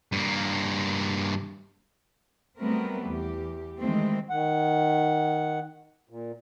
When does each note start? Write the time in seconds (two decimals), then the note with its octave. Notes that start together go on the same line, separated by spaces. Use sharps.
0.12 G2 A#3
2.58 F#3 G3 A3 B3 C4 A#4
3.05 E2 G4
3.79 D#3 E3 G#3 A3 C4
4.29 D#3 F#5
6.09 A#2